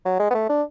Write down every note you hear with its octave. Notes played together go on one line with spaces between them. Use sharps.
F#3
G#3
B3
A3
D4